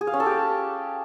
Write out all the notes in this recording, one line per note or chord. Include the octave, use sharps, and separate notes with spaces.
G#4
F5
C#4
A4
G4